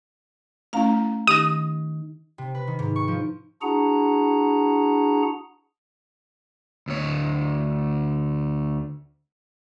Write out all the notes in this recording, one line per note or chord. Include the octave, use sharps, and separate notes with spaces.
A3 C#4 E4 F5 A#5
D#3 D#4 G4 D#6 A#6
C3
B4
D#3
G#2
C#6
F3
D4 E4 F#4 G#4 F#5 A#5
D2 C#5